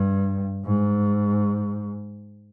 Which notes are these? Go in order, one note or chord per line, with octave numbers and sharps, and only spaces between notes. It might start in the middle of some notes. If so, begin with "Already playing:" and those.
Already playing: G2
G#2